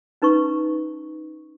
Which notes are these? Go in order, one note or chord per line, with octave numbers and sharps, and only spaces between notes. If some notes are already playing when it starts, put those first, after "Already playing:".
C#4 D#4 B4 A#5 C#6